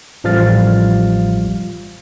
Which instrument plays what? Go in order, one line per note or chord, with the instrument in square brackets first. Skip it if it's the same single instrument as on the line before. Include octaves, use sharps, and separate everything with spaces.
[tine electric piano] A1 F3 G3 F5 F6 A6